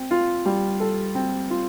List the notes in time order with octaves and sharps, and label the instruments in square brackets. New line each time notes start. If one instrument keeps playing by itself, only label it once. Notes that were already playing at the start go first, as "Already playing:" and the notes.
Already playing: [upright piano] C4
F4
G3
A4
C4
F4